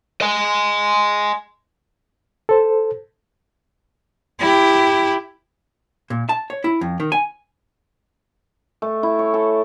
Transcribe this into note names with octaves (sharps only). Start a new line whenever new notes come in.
D#5 G#5
A4 C5
E4 G4
A#2
A5
C#5
E4
F2
D#3
G#5
A3
E4
C#5
A4